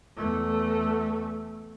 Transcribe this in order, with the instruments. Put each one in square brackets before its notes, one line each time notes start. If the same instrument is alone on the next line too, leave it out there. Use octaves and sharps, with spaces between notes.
[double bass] E2 A3